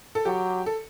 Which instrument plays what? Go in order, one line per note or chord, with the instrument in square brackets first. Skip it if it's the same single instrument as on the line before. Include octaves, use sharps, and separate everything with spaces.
[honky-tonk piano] A4
[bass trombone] F#3 [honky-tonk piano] G4
[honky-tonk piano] A4